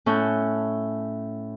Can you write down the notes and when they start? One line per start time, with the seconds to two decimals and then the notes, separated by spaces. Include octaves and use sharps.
0.06 A2 C#4 A4 C#6 F#6 G6